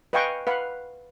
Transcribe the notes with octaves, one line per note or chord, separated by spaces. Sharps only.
B4 D#5 F5 G5 G#5 C#6
B4 F5 F#5